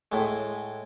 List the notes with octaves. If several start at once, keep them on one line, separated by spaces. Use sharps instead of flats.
A2 G#3